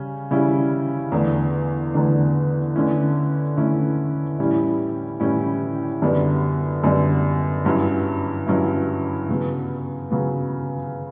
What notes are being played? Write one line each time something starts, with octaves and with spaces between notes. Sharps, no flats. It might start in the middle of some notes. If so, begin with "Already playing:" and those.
Already playing: C#3 G3 C#4
C#3 G3 C#4 E4
E2 D3 A3 D4
E2 D3 A3 D4
D3 A3 C#4 E4
D3 A3 C#4 E4
A2 E3 G3 C#4 E4
A2 E3 G3 C#4 E4
F#2 D3 G3 B3 D4
F#2 D3 G3 B3 D4
G2 F#3 C#4 E4
G2 F#3 C#4 E4
C#3 F#3 B3
C#3 F#3 B3